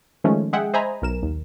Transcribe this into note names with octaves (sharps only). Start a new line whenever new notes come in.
D#3 F3 G#3 A3 C#4
G#3 G#4 E5 F#5 G5
C5 D#5 E5 G#5 A#5 B5
B1 A#4 E7
D#2